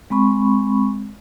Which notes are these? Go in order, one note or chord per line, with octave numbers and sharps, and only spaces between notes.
G#3 C4 B5 C#6